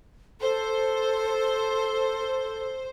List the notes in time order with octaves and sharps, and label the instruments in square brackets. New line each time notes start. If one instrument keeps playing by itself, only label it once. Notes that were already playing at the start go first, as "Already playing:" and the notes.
[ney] A4 [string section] C5